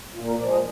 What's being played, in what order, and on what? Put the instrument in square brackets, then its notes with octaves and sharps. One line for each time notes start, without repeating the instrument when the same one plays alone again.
[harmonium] A#2 F4
A#4
F3 G#3 D5
D#5